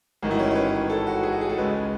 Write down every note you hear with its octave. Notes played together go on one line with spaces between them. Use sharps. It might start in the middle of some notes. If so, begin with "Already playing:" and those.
A1 G#2 D#3 F#4
E4
C#4
C#5
B4
A4
F#4
G#4
F#4
G#4
A4
C#2 C#3 G#3 B4